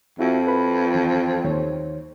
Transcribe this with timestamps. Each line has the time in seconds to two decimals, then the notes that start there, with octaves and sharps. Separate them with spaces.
0.19 F2 E4 F#4 E5
0.47 B4 B5
0.94 D#2 E3
1.44 D#2 C5 C#5